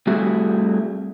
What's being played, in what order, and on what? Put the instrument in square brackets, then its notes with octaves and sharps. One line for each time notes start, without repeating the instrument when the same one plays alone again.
[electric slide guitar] G3 A3 C4 E4 F#4 G#4